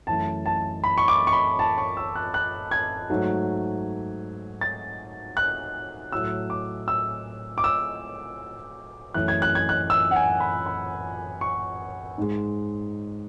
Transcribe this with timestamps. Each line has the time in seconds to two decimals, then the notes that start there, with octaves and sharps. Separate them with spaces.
0.07 F#2 E3 A3 A5
0.46 A5
0.84 B5
0.98 C#6
1.08 D6
1.27 C#6
1.33 B5
1.59 A5
1.78 C#6
1.97 E6
2.15 F#6
2.34 F#6
2.71 G#6
3.10 G#2 F#3 A3
4.61 A6
5.37 F#6
6.12 A2 F#3 A3 E6
6.50 D6
6.88 E6
7.58 D6
7.64 E6
9.14 F#2 E3 A3 F#6
9.28 G#6
9.42 F#6
9.55 G#6
9.69 F#6
9.90 E6
10.11 F#5
10.16 G#5
10.40 B5
10.66 B5
11.41 C#6
12.18 G#2 G#3